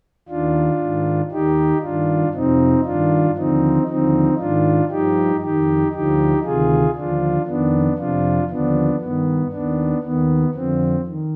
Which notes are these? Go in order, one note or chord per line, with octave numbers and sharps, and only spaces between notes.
D#2 D#3 D4 F4
G#2 D#3
D#2 D#3 D#4 G4
G2 D#3 D4 F4
F2 C3 F3 C4 D#4
G2 D#3 D4 F4
D#2 D3 F3 C4 D#4
D#2 D3 F3 C4 D#4
G#2 D#3 D4 F4
G2 F3 D#4 G4
F2 D#3 D#4 G4
D2 D3 F3 D#4 G4
D2 C3 D#3 F4 G#4
D#2 D3 F3 D4 F4
F2 D#3 B3 D4
F2 C3 F3 D4 F4
D#2 D3 F3 B3 D4
G2 D#3 B3
D#2 D#3 B3 D4
D#2 D#3 B3
F2 D3 F3 C4
D#3